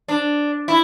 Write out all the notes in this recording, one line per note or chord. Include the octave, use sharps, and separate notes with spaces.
D4
E4